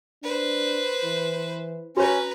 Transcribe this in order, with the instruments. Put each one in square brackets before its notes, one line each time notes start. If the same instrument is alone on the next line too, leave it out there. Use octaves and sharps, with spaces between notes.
[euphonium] D4 [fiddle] B4 C5
[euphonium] E3
[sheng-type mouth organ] C#4 [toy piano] F#4 C#5 [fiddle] B4 A#5